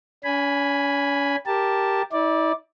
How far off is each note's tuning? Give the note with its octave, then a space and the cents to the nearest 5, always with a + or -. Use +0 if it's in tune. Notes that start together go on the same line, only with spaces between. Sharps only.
C#4 +40 G#5 +0 B5 +0
G4 +0 A#4 +0 A5 +0
E4 -45 D5 +0